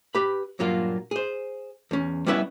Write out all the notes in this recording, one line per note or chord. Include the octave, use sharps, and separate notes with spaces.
G4 B4 B5
G2 A#2 F#3 A#3 F4
G#4 C5
E2 C#4
G3 B3 C#4 E4 B4 E5